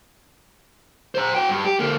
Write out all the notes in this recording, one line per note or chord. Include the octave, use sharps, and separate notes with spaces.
C5 A#5
F#4 G5
G2
G4
D3 A#3